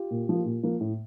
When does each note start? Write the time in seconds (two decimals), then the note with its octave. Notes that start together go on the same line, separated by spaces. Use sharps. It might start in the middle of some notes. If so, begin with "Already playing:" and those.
Already playing: F4 G4
0.11 A#2
0.29 F3 A#3
0.45 A#2
0.63 F3 A#3
0.80 A2